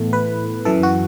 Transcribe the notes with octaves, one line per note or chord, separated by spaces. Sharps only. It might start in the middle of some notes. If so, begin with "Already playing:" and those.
Already playing: A2 E3 A3 B3
B4
F#2 E3 A4
F#4